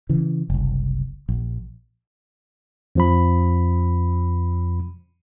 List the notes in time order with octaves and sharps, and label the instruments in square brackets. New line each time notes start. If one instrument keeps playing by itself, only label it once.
[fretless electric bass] C#3 E3
F#1 C2
A#1
[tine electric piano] F2 F3 B5